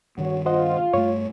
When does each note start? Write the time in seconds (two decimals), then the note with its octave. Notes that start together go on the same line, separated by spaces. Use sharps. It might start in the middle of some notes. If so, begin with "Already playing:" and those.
0.18 G2 D#3 F#4 C#5
0.46 F4 C5 D#5 F#5
0.93 G2 A3 C#5